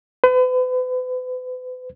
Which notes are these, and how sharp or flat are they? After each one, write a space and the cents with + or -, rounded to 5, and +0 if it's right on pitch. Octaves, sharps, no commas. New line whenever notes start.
B4 +40